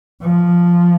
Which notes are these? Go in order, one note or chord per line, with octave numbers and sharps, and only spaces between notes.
F3